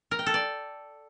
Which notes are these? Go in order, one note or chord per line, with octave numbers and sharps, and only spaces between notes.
A#4
G5
A4
D5